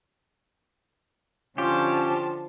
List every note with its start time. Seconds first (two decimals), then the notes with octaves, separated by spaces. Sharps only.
1.58 D3 F3 C#4 F4 G4 A5